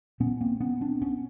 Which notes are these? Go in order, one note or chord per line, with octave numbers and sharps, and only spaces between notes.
A#2 B3 C#4
A#3 C4
B3 C#4
C4 D4
B3 C#4